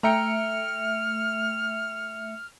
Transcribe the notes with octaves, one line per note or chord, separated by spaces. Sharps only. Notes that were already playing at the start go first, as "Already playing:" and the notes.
A3 E5 G5 A#5 F6 C#7